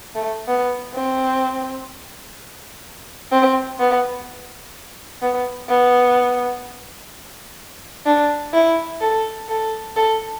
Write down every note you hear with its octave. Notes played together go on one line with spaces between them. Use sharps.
A3
B3
C4
C4
B3
B3
B3
D4
E4
A4
A4
A4